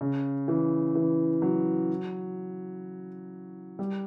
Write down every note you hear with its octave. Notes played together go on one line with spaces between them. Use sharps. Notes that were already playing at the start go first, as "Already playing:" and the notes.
C#3
E3
E3
F#3
G3